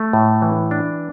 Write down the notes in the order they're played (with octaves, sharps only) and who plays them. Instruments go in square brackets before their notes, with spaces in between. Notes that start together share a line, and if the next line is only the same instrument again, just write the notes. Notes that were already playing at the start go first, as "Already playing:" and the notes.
Already playing: [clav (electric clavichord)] A3
A2
E3
D4